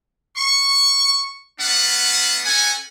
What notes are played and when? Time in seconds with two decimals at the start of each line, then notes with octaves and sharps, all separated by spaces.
0.36 C#6
1.60 A3 B3 D4 F5 F#5
2.45 C#4 A4 F#5 G#5